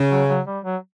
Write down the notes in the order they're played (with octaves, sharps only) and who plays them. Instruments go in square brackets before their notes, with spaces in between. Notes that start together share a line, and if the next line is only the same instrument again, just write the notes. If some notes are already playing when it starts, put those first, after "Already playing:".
Already playing: [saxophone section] C#3
[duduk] F#3
F#3
G3
F#3